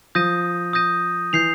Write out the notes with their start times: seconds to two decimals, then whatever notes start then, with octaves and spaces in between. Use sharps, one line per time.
0.15 F3 D#6 G6 A#6 D#7
0.73 D#6 G6 A#6 D#7
1.33 E3 G6 C7 F7